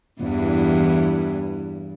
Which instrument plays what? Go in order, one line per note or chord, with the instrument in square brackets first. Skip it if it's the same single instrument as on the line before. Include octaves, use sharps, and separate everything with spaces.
[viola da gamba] E2 G2 E3